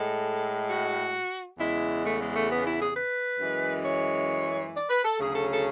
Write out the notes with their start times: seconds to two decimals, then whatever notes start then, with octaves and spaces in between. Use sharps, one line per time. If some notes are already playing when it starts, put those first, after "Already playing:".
Already playing: A2 G#3 A4
0.69 F#4
1.59 E2 C#3 G#3 E4
2.04 A3
2.19 G#3
2.34 A3
2.49 B3
2.64 E4
2.79 G#4
2.94 B4
3.39 F#2 E3 G#3
3.85 C#5
4.75 D5
4.90 B4
5.05 A4
5.19 D2 C#3 F#3 G#4
5.35 A4
5.50 A4